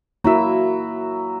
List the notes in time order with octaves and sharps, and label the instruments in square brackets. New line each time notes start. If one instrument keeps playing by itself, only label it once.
[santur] F#3 E5 [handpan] A#3 E4 F#4